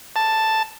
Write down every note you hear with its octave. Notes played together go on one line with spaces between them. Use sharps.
A5